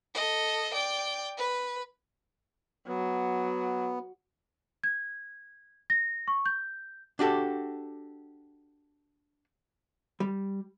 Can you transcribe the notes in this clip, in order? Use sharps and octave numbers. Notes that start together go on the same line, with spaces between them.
A4 D#5
D5 G5
B4
F#3 B3
G#6
A#6
C#6
G6
D4 F#4 G4 A4
G3